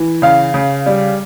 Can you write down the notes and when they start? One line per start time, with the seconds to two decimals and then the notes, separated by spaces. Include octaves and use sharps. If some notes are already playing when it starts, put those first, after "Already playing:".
Already playing: E3
0.22 C#3 F5
0.54 C#3
0.86 G3